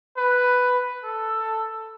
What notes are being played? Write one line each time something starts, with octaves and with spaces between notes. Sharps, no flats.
B4
A4